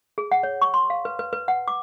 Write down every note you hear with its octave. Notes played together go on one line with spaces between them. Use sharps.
G#4
F#5
C#5
C#6
C6
F5
B4
B4
B4
F#5
D6